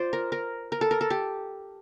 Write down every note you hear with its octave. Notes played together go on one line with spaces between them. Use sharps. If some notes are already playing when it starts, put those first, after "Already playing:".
Already playing: F4 C5 D5
A#4
A#4
A#4
A4
A#4
A4
G4